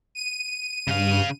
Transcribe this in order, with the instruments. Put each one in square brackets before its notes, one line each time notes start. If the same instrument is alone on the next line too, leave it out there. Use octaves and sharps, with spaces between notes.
[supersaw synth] D#7
[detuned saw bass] G2 [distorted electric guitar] C#3 F5